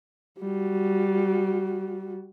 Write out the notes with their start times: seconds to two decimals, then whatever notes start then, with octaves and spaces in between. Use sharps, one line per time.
0.40 G3 F#4